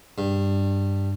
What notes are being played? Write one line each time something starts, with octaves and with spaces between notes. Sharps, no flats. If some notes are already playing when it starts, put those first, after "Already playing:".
G2